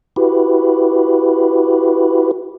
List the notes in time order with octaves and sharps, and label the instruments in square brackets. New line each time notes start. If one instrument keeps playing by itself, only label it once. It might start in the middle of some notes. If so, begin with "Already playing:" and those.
[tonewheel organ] E4 F#4 G4 B4